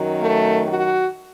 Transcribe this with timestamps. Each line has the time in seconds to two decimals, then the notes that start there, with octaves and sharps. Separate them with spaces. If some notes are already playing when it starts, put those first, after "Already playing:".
Already playing: F#2 D#3 F#3
0.22 A3
0.68 F#4